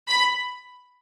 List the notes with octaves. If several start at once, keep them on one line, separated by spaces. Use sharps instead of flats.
B5